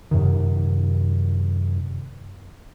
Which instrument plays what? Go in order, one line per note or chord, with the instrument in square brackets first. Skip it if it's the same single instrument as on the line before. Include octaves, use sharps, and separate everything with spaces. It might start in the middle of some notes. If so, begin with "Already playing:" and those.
[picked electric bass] F#2 C3 D#3